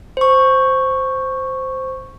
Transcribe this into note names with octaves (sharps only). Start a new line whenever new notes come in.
C5 C#6